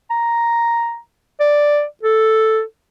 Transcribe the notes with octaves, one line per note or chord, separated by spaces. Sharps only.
A#5
D5
A4